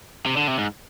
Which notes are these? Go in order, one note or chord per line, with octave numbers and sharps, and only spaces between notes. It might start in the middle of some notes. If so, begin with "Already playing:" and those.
C3
D3
C3
G#2